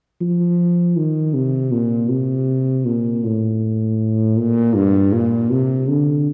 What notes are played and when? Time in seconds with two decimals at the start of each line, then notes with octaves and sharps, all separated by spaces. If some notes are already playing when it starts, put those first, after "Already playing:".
0.21 F3
0.97 D#3
1.34 C3
1.72 A#2
2.10 C3
2.85 A#2
3.24 A2
4.37 A#2
4.75 G2
5.13 A#2
5.51 C3
5.88 D3